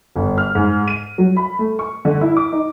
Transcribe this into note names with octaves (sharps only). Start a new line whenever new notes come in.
G1
F6
G#2
D#7
F#3
B5
A3
C#6
D3
E4
D6
D#4